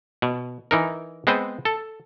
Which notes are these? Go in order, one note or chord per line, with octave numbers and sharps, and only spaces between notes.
B2
E3 D#4 A#4
G#3 B3 C4 B4 C5
A4